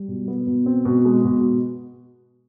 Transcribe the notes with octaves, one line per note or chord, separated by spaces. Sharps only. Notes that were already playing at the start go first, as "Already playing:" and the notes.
Already playing: G3
B2
B3
B2
C4
B2
G#3
B2